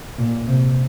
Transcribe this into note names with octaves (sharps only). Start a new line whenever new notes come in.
A#2
C3